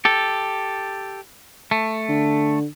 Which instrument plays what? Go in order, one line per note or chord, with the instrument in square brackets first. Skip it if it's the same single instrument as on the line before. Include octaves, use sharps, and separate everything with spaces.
[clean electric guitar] G4 A4
A3
[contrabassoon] D3